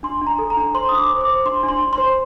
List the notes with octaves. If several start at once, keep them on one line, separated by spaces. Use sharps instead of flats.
D4 C6
D4
A#5
A4
A#5
D4
C5 C6
D4 D#6
D6
C5
D6
C5
D4 C6
D4
C6
D4
C6
C5